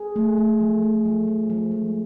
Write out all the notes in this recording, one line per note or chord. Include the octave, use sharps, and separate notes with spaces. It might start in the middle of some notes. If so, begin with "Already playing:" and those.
Already playing: G#4
A3
A3
F3
A3
F3
F3
F3
G#3